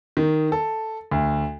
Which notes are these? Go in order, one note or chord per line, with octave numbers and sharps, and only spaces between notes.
D#3
A4
D2